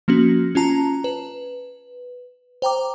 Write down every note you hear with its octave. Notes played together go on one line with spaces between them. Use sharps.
F3 A#3 C#4 F#4
C#4 F4 A5 A#5
B4
C5 G5 A#5 D6